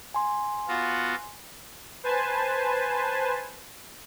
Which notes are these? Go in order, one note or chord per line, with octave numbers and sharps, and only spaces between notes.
G#5 C6
B3 F4 F#4
B4 C5 G#5 A5